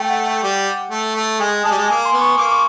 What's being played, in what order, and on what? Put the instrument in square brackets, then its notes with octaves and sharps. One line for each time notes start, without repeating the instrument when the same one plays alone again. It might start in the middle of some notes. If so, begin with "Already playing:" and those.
Already playing: [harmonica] A3 [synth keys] G5
[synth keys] F#5
G5
[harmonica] G3
A3
A3
[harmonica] G#3 [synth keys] G#5
[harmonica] G#3 [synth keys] A5
[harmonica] G3
G#3
[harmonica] A#3 [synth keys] G#5
[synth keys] C6
[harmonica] B3
[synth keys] C#6
[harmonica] A#3 [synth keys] D6